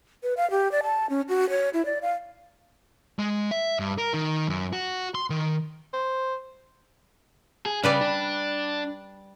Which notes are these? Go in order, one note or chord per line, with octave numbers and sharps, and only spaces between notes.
B4
F5
G4
D5
A5
C#4
F#4
C#5
E4
D5
F5
G#3
E5
G2
A#4
D#3
F#2
F#4
C6
D#3
C5
G#4
C#3 G3 B4 D5
D4